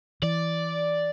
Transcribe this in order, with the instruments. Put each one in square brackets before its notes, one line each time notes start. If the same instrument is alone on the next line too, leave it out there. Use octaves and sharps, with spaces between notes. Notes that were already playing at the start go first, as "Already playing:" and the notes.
[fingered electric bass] E3 [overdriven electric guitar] D5